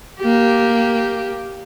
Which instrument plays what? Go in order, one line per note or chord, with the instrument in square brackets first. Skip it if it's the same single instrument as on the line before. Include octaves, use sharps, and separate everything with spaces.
[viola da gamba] A#3 G4